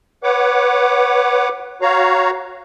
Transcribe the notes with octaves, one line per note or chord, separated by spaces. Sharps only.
B4 C#5 F#5 D6
F#4 C#5 F5 A#5